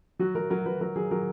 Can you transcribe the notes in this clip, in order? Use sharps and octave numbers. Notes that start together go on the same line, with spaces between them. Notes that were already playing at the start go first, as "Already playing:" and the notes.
F#3 F#4
F#3 A#4
F#3 A#4
F#3 B4
F#3 A#4
F#3 G#4
F#3 A#4